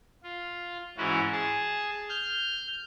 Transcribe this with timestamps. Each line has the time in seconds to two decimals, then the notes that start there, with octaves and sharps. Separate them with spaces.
0.23 F4
0.97 G#2 E3 C#4 E4 F#4
1.32 G#4 A5
2.09 F6 G6